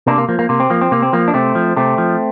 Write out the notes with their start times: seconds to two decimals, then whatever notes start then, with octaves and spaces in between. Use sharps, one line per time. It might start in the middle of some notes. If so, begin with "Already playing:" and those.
0.07 C3 A#3 D4
0.18 A#3
0.29 F3 A#3
0.39 A#3
0.49 C3 A#3
0.60 C4
0.70 F3 A#3
0.81 C4
0.91 C3 A#3
1.02 C4
1.13 F3 A#3
1.28 D4
1.34 C3 A3 C4
1.55 F3
1.76 C3 A3 C4
1.98 F3